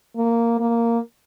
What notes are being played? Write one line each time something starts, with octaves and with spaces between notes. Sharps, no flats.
A#3
A#3